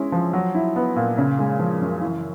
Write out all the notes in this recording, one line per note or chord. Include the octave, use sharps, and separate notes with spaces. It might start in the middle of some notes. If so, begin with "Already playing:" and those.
Already playing: G#3 C#4 E4
F3
F#3
E4
B3
A#2
C#3
G#3
F3
F#2
E3